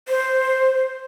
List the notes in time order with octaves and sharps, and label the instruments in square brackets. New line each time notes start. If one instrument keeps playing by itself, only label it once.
[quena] C5